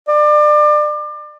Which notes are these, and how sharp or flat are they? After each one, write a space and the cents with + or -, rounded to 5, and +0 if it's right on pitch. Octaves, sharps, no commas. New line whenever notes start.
D5 +30